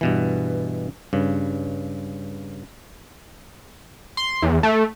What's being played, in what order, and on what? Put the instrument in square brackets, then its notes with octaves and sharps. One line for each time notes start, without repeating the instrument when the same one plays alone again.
[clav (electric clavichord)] G2 B2 E3
G2 C#3
[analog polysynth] C6
E2
A3